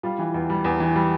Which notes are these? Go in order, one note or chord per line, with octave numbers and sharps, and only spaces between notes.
G3 F4
E3
E2
G3
E2
E3
G3